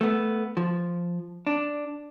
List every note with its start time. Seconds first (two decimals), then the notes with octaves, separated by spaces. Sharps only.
0.01 A3 B3
0.57 F3
1.47 D4